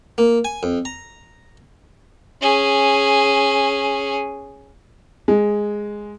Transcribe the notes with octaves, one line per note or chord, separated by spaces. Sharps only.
A#3
G#5
F2
A#5
C#4 G#4
G#3